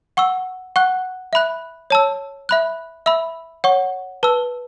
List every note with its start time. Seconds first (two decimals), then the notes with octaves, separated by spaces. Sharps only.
0.17 F#5 C#6 E6
0.76 F#5 C#6 F#6
1.33 E5 B5 F#6
1.90 C#5 A5 E6
2.49 E5 B5 F#6
3.06 E5 B5 E6
3.64 C#5 F#5 C#6
4.23 B4 A5 E6